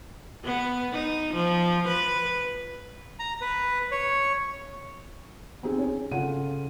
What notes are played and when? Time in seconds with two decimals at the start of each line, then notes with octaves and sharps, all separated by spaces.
0.44 B3
0.93 D#4
1.34 F3
1.88 B4
3.19 A#5
3.41 B4
3.91 C#5
5.63 B3 C4 D#4 G4 G#4
5.79 C#4
6.11 C#3 F4 A4 F#5 D#7